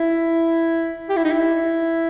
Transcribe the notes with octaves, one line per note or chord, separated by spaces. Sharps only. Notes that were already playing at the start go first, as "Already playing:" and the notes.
Already playing: E4
G4
E4
D#4
E4